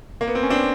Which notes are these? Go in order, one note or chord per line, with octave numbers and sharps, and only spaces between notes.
A#3
B3
C4
C#4
C4 D4